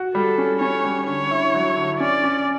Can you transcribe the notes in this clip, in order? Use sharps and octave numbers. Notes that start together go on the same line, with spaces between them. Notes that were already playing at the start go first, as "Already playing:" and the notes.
Already playing: F#4
G3 A4
C#4
C#4 C#5
G3
D3 C#5
E4
F#3
D3
C#4 D5
C#4